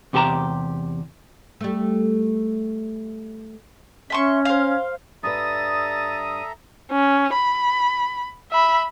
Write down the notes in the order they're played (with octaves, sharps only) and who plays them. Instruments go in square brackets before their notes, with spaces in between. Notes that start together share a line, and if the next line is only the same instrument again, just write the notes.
[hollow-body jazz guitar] E2 C3 G4 A4 A5 A#5
[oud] G3 A3
[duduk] C#4 [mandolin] E5 C6 C#6
[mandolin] C5 F5
[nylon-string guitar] G2 G3 B4 [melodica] A4 E5 A#5 [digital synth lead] D#6 [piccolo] A6
[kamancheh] C#4
B5
E5 B5